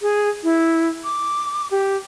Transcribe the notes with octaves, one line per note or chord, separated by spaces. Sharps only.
G#4
E4
D6
G4